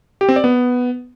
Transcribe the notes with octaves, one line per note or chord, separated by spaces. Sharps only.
G4
C4
D5
B3